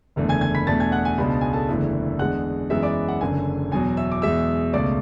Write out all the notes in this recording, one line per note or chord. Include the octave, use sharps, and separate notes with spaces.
F#1 E2 D3 A3
G#5 G#6
G#5 G#6
B5 B6
E2 B2 A3 D4 A5 A6
G#5 G#6
F#5 F#6
G#5
C#2 B2 G#3 D4 B5
A5
G#5
A4 A5
F#1 E2 D3 A3 E4
E2 D3 G#3 F#5 F#6
F#2 E3 G#3 B3 E5 E6
D5 D6
F#5
F#1 F#2 D3 G#5
E2 B2 F#3 G#5
E5 E6
D6
E2 B2 G#3 E5 E6
C#2 B2 A3 D5 D6